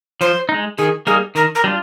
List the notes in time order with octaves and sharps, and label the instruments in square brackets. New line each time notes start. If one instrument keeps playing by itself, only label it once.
[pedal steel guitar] F3 [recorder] C5
[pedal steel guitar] D#4
G#3
[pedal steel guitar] D#3 [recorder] G#4
[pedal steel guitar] G3 A#3 D#4 A#4 [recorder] G#4
[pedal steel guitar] D#3 [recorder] A#4
[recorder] A#4
[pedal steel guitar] G3 D4 F4